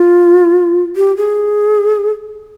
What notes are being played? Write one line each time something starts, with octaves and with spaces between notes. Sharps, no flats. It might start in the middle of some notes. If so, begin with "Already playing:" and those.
Already playing: F4
G4
G#4